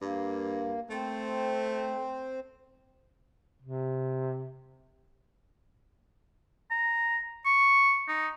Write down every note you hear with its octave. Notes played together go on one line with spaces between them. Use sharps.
G2 A#3
A3 C4 C5
C3
A#5
C#6
D#4